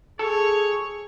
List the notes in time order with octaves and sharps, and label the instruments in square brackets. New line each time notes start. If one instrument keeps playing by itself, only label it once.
[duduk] G#4 [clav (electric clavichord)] A4 [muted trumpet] C#5